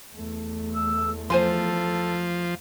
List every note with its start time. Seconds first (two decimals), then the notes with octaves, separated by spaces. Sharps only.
0.13 E2 A3
0.76 E6
1.30 F3 A4 C5 G#5 C6